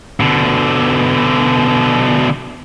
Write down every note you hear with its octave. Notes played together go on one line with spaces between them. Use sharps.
B2 D3